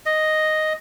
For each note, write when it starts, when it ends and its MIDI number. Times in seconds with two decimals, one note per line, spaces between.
0.06 0.73 75